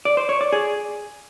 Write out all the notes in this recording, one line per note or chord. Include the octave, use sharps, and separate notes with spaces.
D5
C5
C#5
D5
G#4